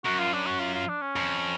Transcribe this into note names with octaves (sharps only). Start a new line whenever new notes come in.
F#2 F#4
F4
D4
F#4
F4
F4
D4
C#4
F2